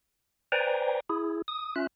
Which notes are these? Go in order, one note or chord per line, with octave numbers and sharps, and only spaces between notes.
B4 C5 D5 G5 G#5 A#5
E4 G#4
D#6
C#4 F4 E5 F#6